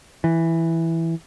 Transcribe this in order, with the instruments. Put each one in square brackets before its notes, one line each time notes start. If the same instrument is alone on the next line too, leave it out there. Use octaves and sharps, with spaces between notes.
[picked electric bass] E3